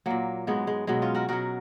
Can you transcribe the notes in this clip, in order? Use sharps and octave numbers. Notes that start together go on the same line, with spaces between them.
A#2 F#3 A#3
G#2 F#3 G#3 B3
G#3
B2 F#3 G#3
C#4 F4
F#4 A#4
B2 F#3 F#4 A#4